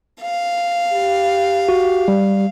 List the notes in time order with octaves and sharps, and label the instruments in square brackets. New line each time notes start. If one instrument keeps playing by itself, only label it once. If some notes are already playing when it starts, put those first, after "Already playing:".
[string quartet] F5
[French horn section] G4
[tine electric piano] F#4
G3